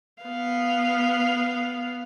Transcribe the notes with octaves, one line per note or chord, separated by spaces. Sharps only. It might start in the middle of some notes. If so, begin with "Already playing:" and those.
B3 F5